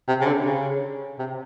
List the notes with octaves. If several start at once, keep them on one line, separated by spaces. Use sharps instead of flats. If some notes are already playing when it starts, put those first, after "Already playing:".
C3
C#3
D3
C#3
C3